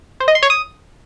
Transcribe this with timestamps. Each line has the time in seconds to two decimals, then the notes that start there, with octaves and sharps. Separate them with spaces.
0.20 C5
0.28 D#5
0.35 C6
0.43 C#5
0.50 D#6